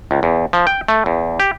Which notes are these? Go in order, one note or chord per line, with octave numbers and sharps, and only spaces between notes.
C#2
E2
F3
G5
A3
E2
G4